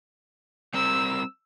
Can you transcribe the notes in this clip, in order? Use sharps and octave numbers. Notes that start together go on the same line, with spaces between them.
G3 C4 A#4 E6